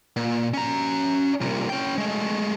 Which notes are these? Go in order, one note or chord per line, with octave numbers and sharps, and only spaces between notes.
A#2
C#4 A#5
C2 A#2
C#4 G5
G#3 A3